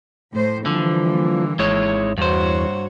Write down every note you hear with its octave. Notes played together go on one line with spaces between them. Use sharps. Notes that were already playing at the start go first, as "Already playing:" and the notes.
A2 C5
D3 E3 F3 G3 A#3
G#1 G#3 E4 C#5
E2 G2 F#4 C5 C#5